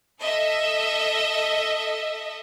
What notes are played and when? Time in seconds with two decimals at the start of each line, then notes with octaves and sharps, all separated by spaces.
0.20 A4 D#5 E5